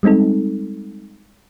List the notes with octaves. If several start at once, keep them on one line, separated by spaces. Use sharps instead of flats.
G3 G#3 C4 D#4 A4